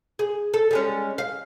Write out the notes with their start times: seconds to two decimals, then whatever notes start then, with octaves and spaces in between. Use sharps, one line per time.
0.19 G#4
0.54 A4
0.71 G3 G#3 C#4
1.18 F5